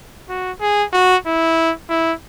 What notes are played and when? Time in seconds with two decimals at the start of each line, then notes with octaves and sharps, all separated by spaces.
0.29 F#4
0.60 G#4
0.93 F#4
1.26 E4
1.90 E4